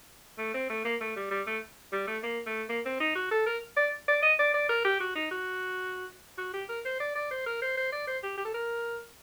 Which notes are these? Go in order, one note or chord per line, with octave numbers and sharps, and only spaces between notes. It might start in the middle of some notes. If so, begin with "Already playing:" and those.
A3
C4
A3
A#3
A3
G3
G3
A3
G3
A3
A#3
A3
A#3
C4
D#4
F#4
A4
A#4
D5
D5
D#5
D5
D5
A#4
G4
F#4
D#4
F#4
F#4
G4
A#4
C5
D5
D5
C5
A#4
C5
C5
D5
C5
G4
G4
A4
A#4